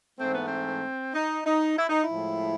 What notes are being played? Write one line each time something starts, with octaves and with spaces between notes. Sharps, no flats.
G#2 E3 A3 C4
B3
C4
D#4
D#4
E4
D#4
E4
A2 F3 G#3